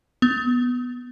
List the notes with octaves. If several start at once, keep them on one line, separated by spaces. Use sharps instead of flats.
B3